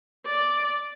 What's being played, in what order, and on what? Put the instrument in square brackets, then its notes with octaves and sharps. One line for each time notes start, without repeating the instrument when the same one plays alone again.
[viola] D5